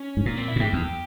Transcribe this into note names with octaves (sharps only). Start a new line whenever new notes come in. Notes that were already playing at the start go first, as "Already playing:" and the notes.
Already playing: C#4
G#2
A#2 A#3
C4
E4
A#2
G#2 G4
E2